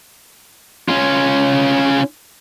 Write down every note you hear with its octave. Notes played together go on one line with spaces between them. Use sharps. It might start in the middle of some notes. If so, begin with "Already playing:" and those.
C#4 F4